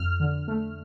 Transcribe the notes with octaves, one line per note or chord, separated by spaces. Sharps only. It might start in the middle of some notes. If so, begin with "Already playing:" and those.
Already playing: F2 F6
D3
A3